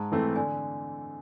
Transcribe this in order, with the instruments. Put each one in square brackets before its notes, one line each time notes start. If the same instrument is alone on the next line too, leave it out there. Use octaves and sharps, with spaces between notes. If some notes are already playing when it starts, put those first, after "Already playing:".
Already playing: [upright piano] G#2 [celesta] A5 A#5
[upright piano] E3 A3 C4
[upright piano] D3 [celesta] G#5